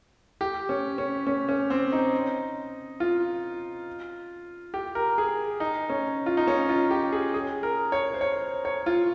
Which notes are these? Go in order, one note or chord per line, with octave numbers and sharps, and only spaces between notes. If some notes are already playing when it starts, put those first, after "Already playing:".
G4
C#4
C#4
C#4
C#4
C4
D#4
F4
G4
A#4
G#4
D#4
C#4
F4
D#4
C#4
F4
G4
G#4
G#4
A#4
C#5
C5
C#5
C#5
F4